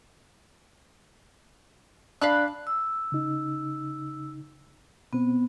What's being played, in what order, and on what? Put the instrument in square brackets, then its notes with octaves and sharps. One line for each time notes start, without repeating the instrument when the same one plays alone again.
[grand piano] D4 [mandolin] F5 B5 F#6
[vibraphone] E6
[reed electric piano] C#3 D#4
[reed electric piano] B2 C4 [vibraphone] B3